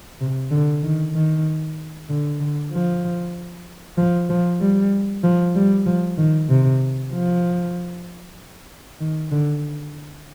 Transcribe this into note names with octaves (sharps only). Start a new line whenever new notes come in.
C3
D3
D#3
D#3
D3
D3
F3
F3
F3
G3
F3
G3
F3
D#3
C3
F3
D#3
D3